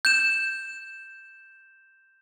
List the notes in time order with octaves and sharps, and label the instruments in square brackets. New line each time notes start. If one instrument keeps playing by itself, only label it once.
[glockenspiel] G6 E7